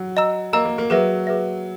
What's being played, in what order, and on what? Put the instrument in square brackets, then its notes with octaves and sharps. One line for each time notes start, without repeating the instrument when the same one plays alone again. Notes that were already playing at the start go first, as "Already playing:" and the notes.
Already playing: [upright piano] F#3
[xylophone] D#5 A#5 E6
[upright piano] A#3 [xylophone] D#5 A#5 E6
[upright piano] A#3
A#3
[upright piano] F#3 [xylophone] G#4 B4 E5
[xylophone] G#4 B4 E5